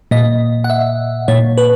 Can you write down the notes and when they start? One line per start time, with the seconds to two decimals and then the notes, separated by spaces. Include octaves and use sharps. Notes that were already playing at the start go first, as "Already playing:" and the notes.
0.11 A#2 D#5
0.64 F#5
0.70 E5
1.28 A#2 C#5
1.58 B4